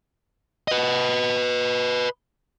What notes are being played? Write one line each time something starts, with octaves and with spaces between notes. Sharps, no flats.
B4 D#5